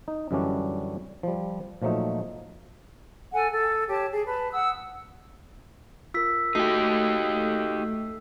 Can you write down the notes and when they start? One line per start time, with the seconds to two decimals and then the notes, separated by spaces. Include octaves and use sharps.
0.08 D#4
0.31 F#2 D3 E3 G3 C#4 D4
1.23 F3 G3
1.82 A#2 F3 F#3 A3 D#4
3.32 A4 F#5 G#5
3.52 A4
3.88 G4 C#5 A5
4.11 G#4
4.25 B4 A5
4.52 F#5 D#6 E6
6.14 F4 A#4 E6 B6
6.55 A3 D#4 F#4 G4 A4 C7